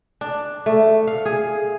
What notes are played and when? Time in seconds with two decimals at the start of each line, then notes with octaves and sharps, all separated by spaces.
0.21 D4
0.66 A3
1.07 F5
1.25 G#4